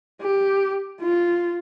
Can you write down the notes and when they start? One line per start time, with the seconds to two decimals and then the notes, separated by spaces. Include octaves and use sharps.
0.21 G4
1.01 F4